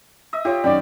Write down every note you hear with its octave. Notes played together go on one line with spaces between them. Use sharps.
D#5 E5
F4 G4 C#5
F#2 D#3 D5 G5